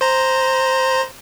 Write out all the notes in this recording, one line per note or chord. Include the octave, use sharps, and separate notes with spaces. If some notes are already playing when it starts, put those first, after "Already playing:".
C5 A#5